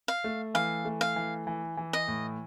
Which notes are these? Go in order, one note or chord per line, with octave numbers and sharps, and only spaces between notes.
F5
A3
E3 F5
A3
F5
E3
E3
E3
D#5
A2